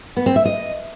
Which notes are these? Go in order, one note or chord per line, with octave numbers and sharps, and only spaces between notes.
B3
C4
E5
D#5